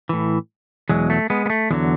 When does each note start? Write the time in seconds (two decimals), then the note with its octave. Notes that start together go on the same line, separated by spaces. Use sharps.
0.09 A2 E3
0.89 E2 B2 F#3 G#3
1.10 A3
1.30 G#3 B3
1.46 B3
1.50 A3
1.71 E2 D3 F#3 G#3